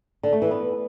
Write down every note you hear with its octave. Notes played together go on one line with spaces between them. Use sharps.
D3
A3
E3
B3